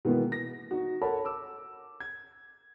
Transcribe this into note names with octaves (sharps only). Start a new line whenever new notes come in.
B2 D#3 E3 G#3 A#3 B3
A#6
D#4 F#4
A4 A#4 C#5 F#5 A5 B5
D6 E6
G#6